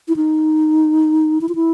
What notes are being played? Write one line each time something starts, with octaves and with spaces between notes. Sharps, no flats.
E4
D#4
E4
F4
E4